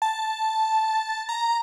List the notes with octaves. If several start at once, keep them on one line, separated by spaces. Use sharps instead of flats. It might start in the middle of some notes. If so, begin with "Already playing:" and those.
A5
A#5